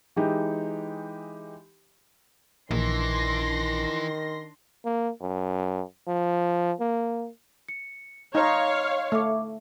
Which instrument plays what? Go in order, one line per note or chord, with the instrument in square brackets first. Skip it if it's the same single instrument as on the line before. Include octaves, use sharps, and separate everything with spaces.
[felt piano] E3 G#3 D#4 G4
[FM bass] A#1 [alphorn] D#3 [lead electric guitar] E3 [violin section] D4 C6 A#6
[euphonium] A#3
F#2
F3
A#3
[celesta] C#7
[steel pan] D#4 [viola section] C#5 F5 [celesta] D#5 C6
[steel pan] A3 [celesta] E5 D6